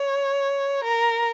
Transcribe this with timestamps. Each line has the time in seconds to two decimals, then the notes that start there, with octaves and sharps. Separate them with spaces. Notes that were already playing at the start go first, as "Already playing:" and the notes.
Already playing: C#5
0.84 A#4